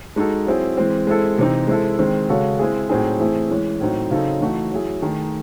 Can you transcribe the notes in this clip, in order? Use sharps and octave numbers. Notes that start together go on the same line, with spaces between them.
G#3 D#4 F#4 A4
F#3 C4 E4 G#4
E3 G#3 C4
G#3 C4 E4 A4
C3 E3 C4 D#4
G#3 C4 E4 A4
D#3 G#3 C4
C#3 G#3 C#4 F#4 A4
G#3 C4 E4 G#4
A2 F#3 C4 D#4 G#4
E3 A3 C4 E4 G#4
E3 G#3 C#4
A2 F#3 C4 D#4
C#3 F#3 C4 D#4 A4
E3 A3 D#4 F#4
F#3 C#4 E4 G#4
D#3 A3 D#4 G#4